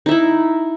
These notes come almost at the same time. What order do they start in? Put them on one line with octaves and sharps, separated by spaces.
D#4 E5 E4